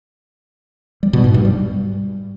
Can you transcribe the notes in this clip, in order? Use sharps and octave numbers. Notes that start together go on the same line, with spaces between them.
G3
B2
G#2
G2
G3